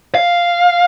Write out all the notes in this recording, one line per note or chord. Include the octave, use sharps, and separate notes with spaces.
F5